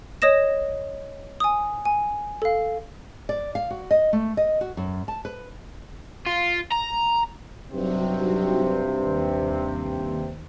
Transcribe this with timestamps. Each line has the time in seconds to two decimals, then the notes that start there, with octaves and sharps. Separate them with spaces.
0.22 C#5 D#5 D#6 A#6 E7
1.40 G#5 D#6
1.85 G#5
2.42 A4 F5
3.29 D5
3.55 F5
3.70 F#4
3.91 D#5
4.13 A3
4.37 D#5
4.61 F#4
4.77 F#2
5.08 A5
5.25 B4
6.27 F4
6.72 A#5
7.72 G2 C3 F#3 C4 D#4 F#4
9.00 D#2